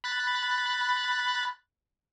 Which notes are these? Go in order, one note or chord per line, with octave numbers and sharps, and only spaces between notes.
B5 F#6 A6